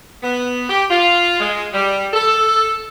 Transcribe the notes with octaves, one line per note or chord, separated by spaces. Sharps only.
B3
G4
F4
G#3
G3
A4